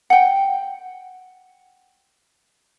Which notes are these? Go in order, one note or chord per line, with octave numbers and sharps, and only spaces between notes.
F#5 G5